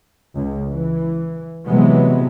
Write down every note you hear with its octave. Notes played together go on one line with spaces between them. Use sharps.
C#2
E3
C3 E3 F#3 G#3 B3